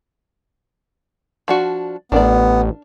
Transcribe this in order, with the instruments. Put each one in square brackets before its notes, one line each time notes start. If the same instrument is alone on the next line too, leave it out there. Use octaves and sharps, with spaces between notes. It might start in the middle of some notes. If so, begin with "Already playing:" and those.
[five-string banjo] F3 D4 F#4
[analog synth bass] A1 [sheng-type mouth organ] B3 [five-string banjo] D4 A#4 D5